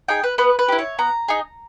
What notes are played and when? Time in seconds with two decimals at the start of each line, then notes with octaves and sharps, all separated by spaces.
0.08 D#4 G#4 G5
0.23 B4
0.38 B3 B4
0.59 B4
0.68 E4 G4
0.78 C#5
0.98 B3 A#5
1.28 D#4 G#4